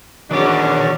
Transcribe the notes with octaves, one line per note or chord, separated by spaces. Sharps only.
E2 D#3 C#4 D4 F#4 D5